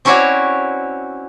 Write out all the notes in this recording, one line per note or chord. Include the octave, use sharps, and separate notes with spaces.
C4 C#4 E4 F#4 C#5 D5